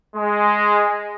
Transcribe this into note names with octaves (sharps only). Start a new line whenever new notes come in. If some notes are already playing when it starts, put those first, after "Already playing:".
G#3